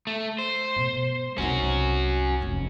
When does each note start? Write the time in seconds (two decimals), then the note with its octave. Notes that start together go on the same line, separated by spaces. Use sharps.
0.07 A3
0.39 C5
0.77 B2
1.38 C2 C#4 D#4 F#4
2.41 F1 E2